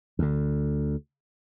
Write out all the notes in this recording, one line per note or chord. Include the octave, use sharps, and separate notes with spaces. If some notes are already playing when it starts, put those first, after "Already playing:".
D2 D3